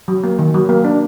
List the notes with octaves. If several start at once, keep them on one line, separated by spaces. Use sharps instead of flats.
F#3
A#3
D#3
F#3
A#3
D4